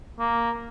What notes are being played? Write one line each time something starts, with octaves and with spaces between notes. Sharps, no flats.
A#3